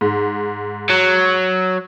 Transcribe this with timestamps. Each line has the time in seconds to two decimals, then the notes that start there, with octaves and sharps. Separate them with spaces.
0.01 G#2
0.89 F#3